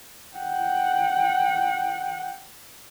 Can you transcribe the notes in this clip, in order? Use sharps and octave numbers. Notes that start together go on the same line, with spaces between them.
F#5 G5